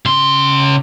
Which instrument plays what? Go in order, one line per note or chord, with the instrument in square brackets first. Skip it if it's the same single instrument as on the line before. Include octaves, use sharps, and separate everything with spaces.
[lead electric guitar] C#3 C6